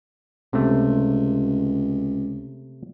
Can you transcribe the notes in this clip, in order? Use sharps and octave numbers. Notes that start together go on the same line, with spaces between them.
C#2 C3 A3